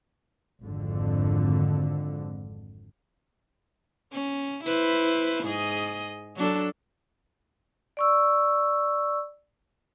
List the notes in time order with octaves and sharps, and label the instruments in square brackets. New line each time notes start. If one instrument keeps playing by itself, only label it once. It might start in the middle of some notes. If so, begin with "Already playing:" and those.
[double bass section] G#1 F2 D3
[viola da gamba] C#4
E4 B4 C5
G#2 G#4 D#5
F#3 D4 A4
[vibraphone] D5 C#6 E6